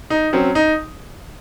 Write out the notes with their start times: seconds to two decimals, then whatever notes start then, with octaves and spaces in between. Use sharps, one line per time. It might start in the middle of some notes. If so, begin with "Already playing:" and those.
0.10 D#4
0.33 F#3 C4 C#4
0.55 D#4